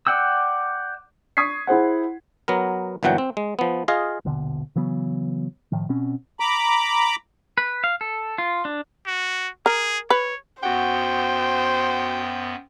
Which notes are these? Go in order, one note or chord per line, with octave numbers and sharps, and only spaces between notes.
D5 F#5 G5 E6
C#6 D#6 G#6 B6 C7
E4 G#4 C5 F#5
F#3 B3 A#4
G1 A#2 E3 F#3 F#5 G5
C4
G#3
F3 B3
F4 G#4 D#5 F5
D#1 A#1 B2 D3
C#3 E3 F#3 B3
A2 D#3 F3
B2 C4 C#4
A#5 B5 D6
B4
F5
A4
F4
D4
F#4
G#4 A#4
B4 C#5
F#2 B3 F#4 C5 F#5 G5